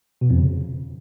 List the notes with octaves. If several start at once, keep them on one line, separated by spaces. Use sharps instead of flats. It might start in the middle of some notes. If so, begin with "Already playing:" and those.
B2
F2
C#3